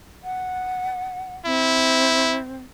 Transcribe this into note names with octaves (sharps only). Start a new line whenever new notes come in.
F#5
C4 E4